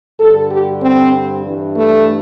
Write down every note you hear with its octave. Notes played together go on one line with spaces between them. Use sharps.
G2 D3 A4
G4
C4
G2 E3
A3